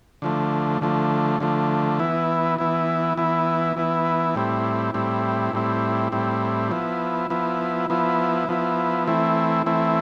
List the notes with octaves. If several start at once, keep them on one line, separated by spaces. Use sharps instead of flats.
D3 F3 A3
D3 F3 A3
D3 F3 A3
E3 B3 E4
E3 B3 E4
E3 B3 E4
E3 B3 E4
A2 G3 C4 E4
A2 G3 C4 E4
A2 G3 C4 E4
A2 G3 C4 E4
F3 B3 E4
F3 B3 E4
F3 B3 E4
F3 B3 E4
E3 A3 C4 E4
E3 A3 C4 E4